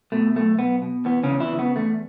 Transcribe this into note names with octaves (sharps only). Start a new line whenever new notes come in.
B2 A3
B1 A3
B1 B3
B2
E3 B3
C#3 C#4
E2
E3 E4
C#3
B3
E2 A3